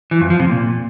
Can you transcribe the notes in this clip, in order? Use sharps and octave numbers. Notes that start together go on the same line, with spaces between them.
E3
F2
F3
C3
A#2